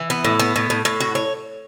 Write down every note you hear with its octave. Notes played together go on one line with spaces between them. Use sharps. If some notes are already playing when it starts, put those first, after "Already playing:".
Already playing: E3
B3
A2
B3
A2
A2
A2
F#4
C#5